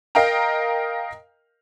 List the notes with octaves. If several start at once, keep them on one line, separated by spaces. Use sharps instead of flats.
A#4 D#5 F5 G5 A#5